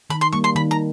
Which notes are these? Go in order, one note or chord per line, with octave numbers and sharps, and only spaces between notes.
D#3 B5
C6
G3 A#3 C#6
C6
D#3 B5
A#5